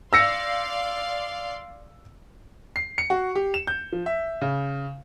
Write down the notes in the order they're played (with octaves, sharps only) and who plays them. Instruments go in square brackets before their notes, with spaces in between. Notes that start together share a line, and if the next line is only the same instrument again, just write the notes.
[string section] D5 F5 C6 [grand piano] E6 A#6 C#7
[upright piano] C7
C#7
F#4
G4
E7
G6
F3
E5
C#3